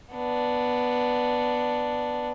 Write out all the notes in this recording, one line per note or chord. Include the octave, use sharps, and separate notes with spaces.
B3 D4